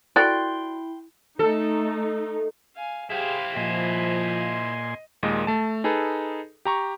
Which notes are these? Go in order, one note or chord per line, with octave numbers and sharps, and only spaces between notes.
E4 F#4 A4 D5 G5 C6 F#6 A6
A3 D#4 A4
F5 G#5
E4 G4 G#4 C5 F5
A#2 F3 D#5 G#5 C6
D#2 A#2 G#3 D#5
A3 A5
D#4 G#4 A4 B4
G4 A#5 C#6